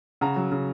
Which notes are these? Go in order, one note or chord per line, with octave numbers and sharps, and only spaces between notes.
C#3 F#5 A#5
F#3
C#3